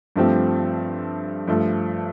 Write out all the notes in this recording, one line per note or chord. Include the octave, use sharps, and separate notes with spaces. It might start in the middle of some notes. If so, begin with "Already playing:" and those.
G2 F3 A3 C4 G4
G2 F3 A3